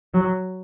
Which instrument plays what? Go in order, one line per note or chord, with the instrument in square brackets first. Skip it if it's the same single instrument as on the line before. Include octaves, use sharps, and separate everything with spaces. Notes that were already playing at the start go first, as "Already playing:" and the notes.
[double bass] F#3